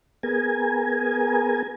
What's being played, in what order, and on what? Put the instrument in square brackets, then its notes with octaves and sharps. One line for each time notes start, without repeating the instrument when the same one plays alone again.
[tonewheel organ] B3 G#4 A#4 G#5